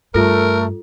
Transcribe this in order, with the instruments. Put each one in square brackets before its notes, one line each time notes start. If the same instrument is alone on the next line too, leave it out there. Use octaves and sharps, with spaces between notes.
[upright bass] G2 [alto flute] A3 [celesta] F4 A4 [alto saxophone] A#4